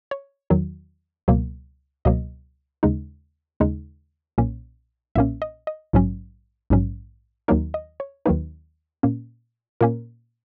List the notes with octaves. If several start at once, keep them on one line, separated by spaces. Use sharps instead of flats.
C#5
E2 D#3 F#3
C#2 B2 F#3 A#3
C#2 B2 F#3 A#3 D#5
D#2 C#3 G#3 D#4
D#2 C#3 G#3 D#4
B1 A#2 A#3 C#4
B1 A#2 A#3 C#4 E5
D#5
D#5
A#1 G#2 F#3 C#4
A#1 G#2 F#3 C#4
D#2 D#3 F#3 A#3 D#4 A#4
D#5
C#5
D#2 D#3 F#3 A#3 D#4 B4
A#2 A#3 C#4
A#2 A#3 C#4 A#4